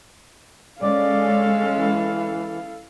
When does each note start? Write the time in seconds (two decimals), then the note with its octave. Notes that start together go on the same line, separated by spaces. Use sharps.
0.81 G#3 C#4 A4 D5 F5
1.76 E3